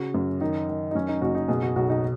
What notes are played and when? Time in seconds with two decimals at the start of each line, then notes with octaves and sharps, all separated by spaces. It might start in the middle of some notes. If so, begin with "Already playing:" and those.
Already playing: C#3 F#4
0.14 F#2
0.41 D#3 D#4
0.69 D#3
0.91 D#4
0.95 F#2 C#4
1.08 D#4
1.21 F#1 F#4
1.35 D#4
1.48 B2 G#4
1.63 F#4
1.76 B1 F#4
1.89 D#4